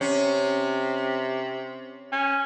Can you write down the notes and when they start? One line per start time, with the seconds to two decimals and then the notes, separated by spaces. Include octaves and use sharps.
0.01 C3 C#4
2.12 C#4